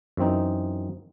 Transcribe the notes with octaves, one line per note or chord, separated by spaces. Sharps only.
F#2 E3 C4 D#4